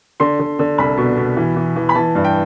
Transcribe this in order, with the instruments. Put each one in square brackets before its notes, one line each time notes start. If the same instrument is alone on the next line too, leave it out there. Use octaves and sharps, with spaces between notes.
[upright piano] D3 C6
D3
D3
C2 B5
B2
B2
E3
E3
E3
B5
E3 A5
G2
G5